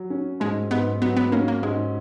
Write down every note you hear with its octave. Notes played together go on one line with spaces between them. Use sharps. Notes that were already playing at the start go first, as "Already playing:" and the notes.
Already playing: F#3
C#4
G#2 G#3
G#2 B3
F#3 B3
B3
A#3 C#4
A#3
G#2 G#3